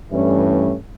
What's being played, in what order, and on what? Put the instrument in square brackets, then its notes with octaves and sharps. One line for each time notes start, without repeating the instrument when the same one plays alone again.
[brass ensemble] G2 E3 A3 C#4